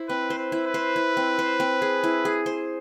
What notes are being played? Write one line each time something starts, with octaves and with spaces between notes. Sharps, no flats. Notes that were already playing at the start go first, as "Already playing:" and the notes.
Already playing: E4 C5
C4 B4
C5
B4
E4
B4
C5
E4
C4
C5
C4
G#4
E4
G#4
C5